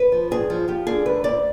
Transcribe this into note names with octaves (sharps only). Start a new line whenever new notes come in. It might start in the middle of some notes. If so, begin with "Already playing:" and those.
Already playing: B4
F3
G2 G#4
F3
F3 G4
D3 G#4
D2 B4
D2 D5